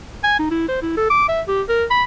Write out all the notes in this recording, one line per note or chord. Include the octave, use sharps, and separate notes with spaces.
G#5
D#4
E4
C5
E4
A4
D6
E5
G4
A#4
B5